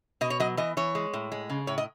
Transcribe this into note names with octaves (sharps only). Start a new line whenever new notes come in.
B2 D#5
C#5
F#3 D#5
E3 D#5
E3 C#5
G#3
A2
G#3
C#3
A2 C#5
D#5